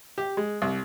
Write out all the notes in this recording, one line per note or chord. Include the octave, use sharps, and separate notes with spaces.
G4
G#3
C2